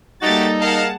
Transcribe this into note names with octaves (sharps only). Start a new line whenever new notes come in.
G3 A3 A#3 D#4 F#4 G4 A4 A6
G#4 A#4 D#5 F5 F#5 A5